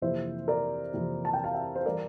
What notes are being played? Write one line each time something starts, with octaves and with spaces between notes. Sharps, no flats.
F2 C3 E3 A#3 E4 C5 E5
A#4 D5
F2 C3 E3 A#3 E4
A5
G5
F5 A5
E5 G5
C5
E3 G3 A#4 D5